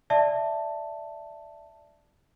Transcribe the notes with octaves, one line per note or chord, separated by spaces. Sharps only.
D5 E5 A5